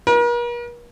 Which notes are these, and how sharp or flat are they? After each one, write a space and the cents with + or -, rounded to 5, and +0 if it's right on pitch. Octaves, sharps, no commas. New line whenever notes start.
A#4 +45